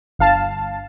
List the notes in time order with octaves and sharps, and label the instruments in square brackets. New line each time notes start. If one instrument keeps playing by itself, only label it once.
[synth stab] G1 F5 A5